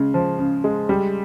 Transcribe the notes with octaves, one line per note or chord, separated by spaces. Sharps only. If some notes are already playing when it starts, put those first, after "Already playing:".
Already playing: C#3 G#3
F3
C#3
G#3
G3